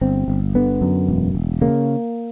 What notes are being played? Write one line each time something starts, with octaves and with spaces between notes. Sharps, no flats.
G1 C4
G1
D3 B3
F#2
E1
E1
C#3 A#3